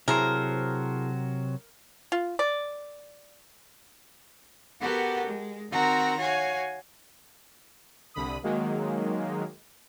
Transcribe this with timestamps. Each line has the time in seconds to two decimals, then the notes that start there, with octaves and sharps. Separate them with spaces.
0.08 C3 F#3 E4 G#4 A#4 C5 A5
2.12 F4
2.39 D5
4.80 B3 F#4 G4 A4 A#4
5.25 G#3
5.71 D#3 C4 F#4 A#4 A#5
6.16 F#4 C#5 F5 G#5
8.14 C2 D3 B5 D#6
8.43 D#3 F#3 G#3 A#3